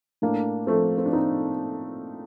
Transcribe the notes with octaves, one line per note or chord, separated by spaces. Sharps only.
A2 A#3 D4
F3 A3 C4
C4
D4
A2 C4 D#4